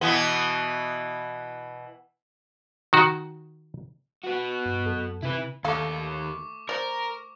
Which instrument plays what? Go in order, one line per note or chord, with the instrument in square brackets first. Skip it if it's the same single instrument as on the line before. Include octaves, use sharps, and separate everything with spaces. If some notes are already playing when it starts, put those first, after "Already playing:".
[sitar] B2 E3 B3
[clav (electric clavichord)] D#3 F#4
[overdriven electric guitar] B3 F#4
[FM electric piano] G2
F#2 A4
[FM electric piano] C3 [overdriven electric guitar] E4 B4
[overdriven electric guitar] D#2 [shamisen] D3 F5 [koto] A3 A4 [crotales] C#6 D6
[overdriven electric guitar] A#4 [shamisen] C5 D5